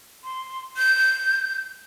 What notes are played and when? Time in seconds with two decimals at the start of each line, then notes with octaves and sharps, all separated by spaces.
0.24 C6
0.77 G6